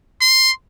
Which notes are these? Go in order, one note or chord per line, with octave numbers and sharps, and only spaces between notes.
C6